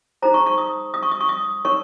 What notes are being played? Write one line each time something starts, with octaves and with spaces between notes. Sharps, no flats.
D#4 G#4 C5 A#5
C#6
C#6
D#6
D#6
C#6
D#6
C#6
D#6
D#4 A#4 C#5 C#6